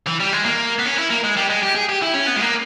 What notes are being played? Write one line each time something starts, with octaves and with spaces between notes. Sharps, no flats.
E3
G3
G#3
A#3
B3
C#4
E4
A#3
G#3
G3
G#3
G4
G#4
G4
E4
C#4
B3
G#3
A#3